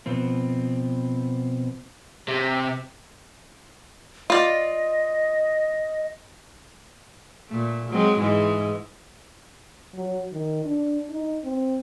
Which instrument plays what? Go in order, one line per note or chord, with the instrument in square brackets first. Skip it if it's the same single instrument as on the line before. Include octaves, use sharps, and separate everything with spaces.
[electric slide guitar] B2 F3 C4
[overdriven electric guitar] C3
[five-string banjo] F4 D5 [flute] D#5
[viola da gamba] A#2 A3
F#3 G#3 C4
G#2 E3 G#3
[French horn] F#3
D#3
D4
D#4
C4